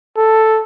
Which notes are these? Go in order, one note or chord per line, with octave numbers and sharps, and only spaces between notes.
A4